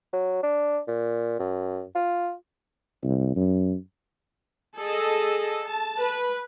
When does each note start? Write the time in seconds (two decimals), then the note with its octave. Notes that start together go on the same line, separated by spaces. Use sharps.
0.13 F#3
0.43 D4
0.87 A#2
1.39 F#2
1.95 F4
3.03 C2
3.36 F#2
4.77 G#4 A4 D#5
5.65 A5
6.00 B4